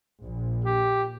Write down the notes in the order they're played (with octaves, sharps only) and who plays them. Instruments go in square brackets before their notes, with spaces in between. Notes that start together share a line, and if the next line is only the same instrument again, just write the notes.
[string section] A#1
[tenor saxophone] G4